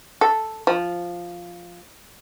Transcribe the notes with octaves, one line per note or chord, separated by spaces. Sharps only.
A4
F3